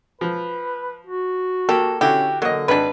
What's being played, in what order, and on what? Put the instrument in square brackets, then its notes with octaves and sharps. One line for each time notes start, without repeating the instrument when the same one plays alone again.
[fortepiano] F3 [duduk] B4
[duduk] F#4
[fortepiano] A#3 [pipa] G4 A4
[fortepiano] D3 E4 F#4 [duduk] C#4 [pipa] G4
[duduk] D3 [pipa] F#3 [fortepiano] A#3 D#5
[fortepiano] G#1 [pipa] D4 B4